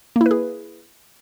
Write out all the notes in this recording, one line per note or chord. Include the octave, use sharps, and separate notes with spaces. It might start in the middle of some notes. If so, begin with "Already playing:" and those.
A#3 E4 G#4 B4